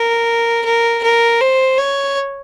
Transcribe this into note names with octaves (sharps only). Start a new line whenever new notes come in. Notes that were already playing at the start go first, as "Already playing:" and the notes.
Already playing: A#4
A#4
A#4
C5
C#5